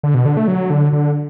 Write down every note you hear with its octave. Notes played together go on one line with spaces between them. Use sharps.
D3
B2
D3
A3
F#3
D3
D3